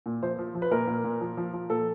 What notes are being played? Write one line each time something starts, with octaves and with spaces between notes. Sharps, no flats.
A#2
F3 C5
F3
F3
B4
A#2 A#4
A#2
A#2
F3
F3
F3
A#2 A4